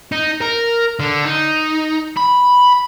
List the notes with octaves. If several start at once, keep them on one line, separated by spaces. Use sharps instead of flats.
D#4
A#4
D3
D#4
B5